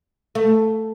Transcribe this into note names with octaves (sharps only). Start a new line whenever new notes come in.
A3